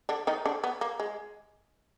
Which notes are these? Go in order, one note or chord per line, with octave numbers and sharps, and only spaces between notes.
D3 D4
D#3 D#4
D3 D4
B3
A#3
G#3